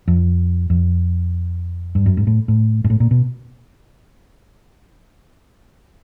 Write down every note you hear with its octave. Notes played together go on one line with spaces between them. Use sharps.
F2
F2
G2
F#2
G#2
A2
A2
G#2
A2
A#2
B2